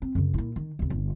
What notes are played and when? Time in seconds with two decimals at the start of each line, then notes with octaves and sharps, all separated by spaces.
0.02 C4
0.15 F#2 C#3
0.34 A#2 E4
0.56 D#3
0.79 D#2 C3
0.90 G1